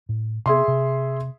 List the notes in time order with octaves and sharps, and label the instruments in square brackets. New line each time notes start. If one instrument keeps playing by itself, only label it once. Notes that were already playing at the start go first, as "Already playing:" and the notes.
[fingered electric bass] A2
[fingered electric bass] C3 B3 [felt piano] G#4 E5 C6
[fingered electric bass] C3